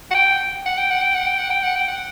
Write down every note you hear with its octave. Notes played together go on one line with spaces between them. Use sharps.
F#5
G5
F#5
G5
F#5
G5
F#5
G5
F#5
G5
F#5
G5
F#5